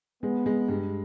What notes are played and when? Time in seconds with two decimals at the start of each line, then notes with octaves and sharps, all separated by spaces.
0.22 G#3 B3
0.46 G#3
0.68 G2